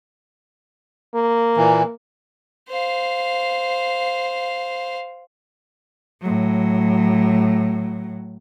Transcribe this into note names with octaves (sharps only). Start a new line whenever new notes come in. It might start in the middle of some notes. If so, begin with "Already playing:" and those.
A#3
A#2 E3
C5 F5
A2 F#3